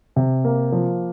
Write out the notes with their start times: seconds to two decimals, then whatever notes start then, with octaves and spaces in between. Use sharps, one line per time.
0.16 C3
0.44 A#3
0.72 F3